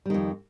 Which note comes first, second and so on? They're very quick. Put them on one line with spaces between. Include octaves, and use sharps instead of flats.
G3 D#3 F2